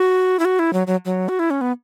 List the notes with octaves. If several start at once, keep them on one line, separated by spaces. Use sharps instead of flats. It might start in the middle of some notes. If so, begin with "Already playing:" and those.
Already playing: F#4
E4
F#4
E4
F#3
F#3
F#3
F#4
E4
C#4
B3